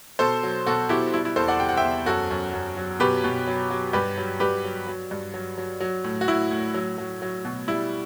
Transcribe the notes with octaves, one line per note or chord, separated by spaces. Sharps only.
B2 A4 C5
F#3
B2 F#4 A4
B2 E4 G4
G3 E4
E4
E2 A4 C5
D5 F#5
C3 G5
F#5
E5 G5
E2
F#2 F#4 A4
F#2
F#2
F#3
B2 G4 B4
B2
F#3
F#3
G2 G4 B4
F#3
G2 G4 B4
F#3
F#3
G2
F#3
F#3
F#3
A2
F#4
A2 E4
A2
F#3
F#3
F#3
B2
G3 E4